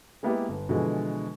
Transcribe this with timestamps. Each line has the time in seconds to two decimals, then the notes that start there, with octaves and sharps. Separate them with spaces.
0.23 G#3 A#3 B3 E4 G4
0.49 G1
0.69 B2 D3 E3 F3 G#3